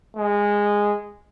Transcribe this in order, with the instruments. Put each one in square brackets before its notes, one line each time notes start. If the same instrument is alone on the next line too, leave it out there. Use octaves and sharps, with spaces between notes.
[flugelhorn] G#3